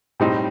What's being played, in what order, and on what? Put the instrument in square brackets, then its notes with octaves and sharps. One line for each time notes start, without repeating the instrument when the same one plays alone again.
[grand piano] A2 G3 C4 D#4